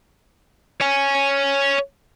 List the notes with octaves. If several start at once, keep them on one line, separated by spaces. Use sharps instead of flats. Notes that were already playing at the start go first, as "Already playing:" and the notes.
C#5 G#5